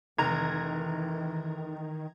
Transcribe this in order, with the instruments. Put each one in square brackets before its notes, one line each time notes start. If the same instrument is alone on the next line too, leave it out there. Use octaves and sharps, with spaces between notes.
[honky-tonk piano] F1 [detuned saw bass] D#3 [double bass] E3 [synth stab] A#5 G#6